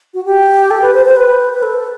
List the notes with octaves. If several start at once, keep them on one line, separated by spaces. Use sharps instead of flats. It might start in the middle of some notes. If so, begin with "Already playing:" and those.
F#4
G4
A4
B4
C5
C5
B4
B4
A4